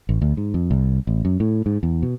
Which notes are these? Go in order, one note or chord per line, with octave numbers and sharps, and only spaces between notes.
A1
D2
G#2
F2
C2
A1
F#2
A2
G#2
E2
B2